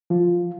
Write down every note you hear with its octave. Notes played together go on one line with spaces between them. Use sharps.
F3 F4